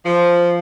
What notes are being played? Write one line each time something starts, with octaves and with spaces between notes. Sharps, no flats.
F3